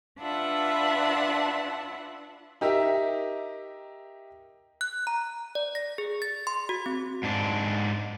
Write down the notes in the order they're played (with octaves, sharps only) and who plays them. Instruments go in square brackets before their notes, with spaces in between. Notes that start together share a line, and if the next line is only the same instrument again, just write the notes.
[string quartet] D4 F4 B4 E5 F#5 A5
[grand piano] D#4 G4 A#4 E5
[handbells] F#6
A#5
D5
A#6
G#4
A6
C6
F#4
C4
[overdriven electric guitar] G#2 D4